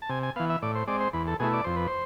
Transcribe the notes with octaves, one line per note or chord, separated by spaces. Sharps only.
A5
C3 G#5
G#5
E3 B3 F5
E5
A2 D5
C5
G#3 C4 D5
C5
E2 B4
A4
B2 A3 E4 G#4
D5
F2 C5
B4
C5